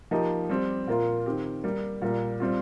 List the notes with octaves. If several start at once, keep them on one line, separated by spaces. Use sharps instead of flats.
F3 A#3 D#4 G4
G3 C4 G4
A#2 A#3 F4
D#3 C4 G4
G3 A#3 G4
A#2 G3 A#3
G3 C4 F4